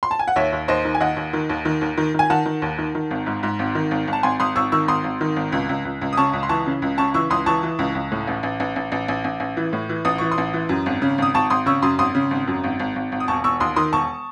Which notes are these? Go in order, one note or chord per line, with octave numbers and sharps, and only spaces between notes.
C6
A5
G#5
F#5
D#2 C#5 E5
D#2
D#2 C5 D#5
D#3
G#5
D#2 D#5 F#5
D#2
D#3
D#2
D#3
D#2
D#3
D#3 G#5
D#3 F#5 A5
D#3
D#2
D#3
D#3
G#1
G#2
G#2
G#1
D#3
G#1
G#1
A5
G#1 G#5 C6
G#1 C6 D#6
G#1 C#6 E6
D#3 C#6 E6
G#1 C6 D#6
G#1
D#3
G#1
C#2
C#2
C#2
C#2
D#6
C#3 A5 C#6
C#2
C6
E3 A5 C#6
C#3
C#2
C#3 A5 C#6
E3 C#6 E6
C#2 C6 D#6
E3 A5 C#6
E3
C#2
C#2
A2
A1
A1
A1
A1
A1
A1
A1
A1
E3
A2
E3
A1 D#6
E3 C#6
C6 D#6
A1
E3
F#2
G#1
C#3
G#1 D#6
G#1 A5 C#6
G#1 C6 D#6
C#3 C#6 E6
F#2 C6 D#6
G#1 C6 D#6
C#3
G#1
F#2
G#1
G#1
G#1
G#1
D#6
E1 A5 C#6
E1 C#6 E6
D#2 C6 D#6
D#3 C6 D#6
E1 A5 C#6